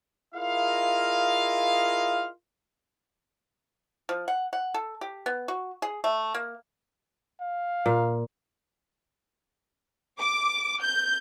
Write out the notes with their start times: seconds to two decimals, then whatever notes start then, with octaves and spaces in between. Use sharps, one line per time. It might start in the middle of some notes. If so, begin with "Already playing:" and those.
0.35 E4 F4 G#4 A#4 D#5 F5
4.09 F3
4.28 F#5
4.53 F#5
4.74 A4
5.01 G4
5.26 B3
5.48 F#4
5.82 G#4
6.04 A3
6.34 A#3
7.41 F5
7.86 A#2
10.19 D6
10.82 G6